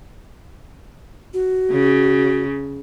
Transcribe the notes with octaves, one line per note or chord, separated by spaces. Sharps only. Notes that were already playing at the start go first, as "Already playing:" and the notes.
F#4
C#3